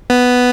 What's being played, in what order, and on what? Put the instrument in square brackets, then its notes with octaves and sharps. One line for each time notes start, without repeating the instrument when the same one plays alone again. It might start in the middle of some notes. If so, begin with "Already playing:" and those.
[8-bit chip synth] B3